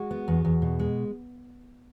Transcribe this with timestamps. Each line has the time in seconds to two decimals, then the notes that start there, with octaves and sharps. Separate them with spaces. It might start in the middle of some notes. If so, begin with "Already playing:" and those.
Already playing: G#3 F#4
0.11 B3
0.28 E2
0.45 E2
0.62 B2
0.79 G#3